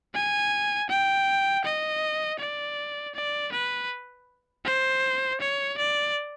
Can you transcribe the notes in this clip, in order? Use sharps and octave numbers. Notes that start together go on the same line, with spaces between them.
G#5
G5
D#5
D5
D5
B4
C5
C#5
D5